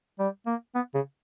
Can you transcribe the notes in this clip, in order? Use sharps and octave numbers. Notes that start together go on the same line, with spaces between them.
G3
A#3
B3
C#3